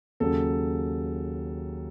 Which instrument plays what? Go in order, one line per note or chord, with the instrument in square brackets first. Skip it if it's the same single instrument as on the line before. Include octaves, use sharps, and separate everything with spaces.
[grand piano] D#2 C#3 F#3 C#4 A4